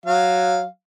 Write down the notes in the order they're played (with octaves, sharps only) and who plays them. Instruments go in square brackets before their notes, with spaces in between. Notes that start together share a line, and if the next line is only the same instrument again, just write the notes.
[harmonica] F#3 F5